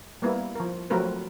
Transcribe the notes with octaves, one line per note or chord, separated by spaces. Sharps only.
G3 A#3 B3 E4
F3 A#4
F3 F#3 A3 C4 A#4 B4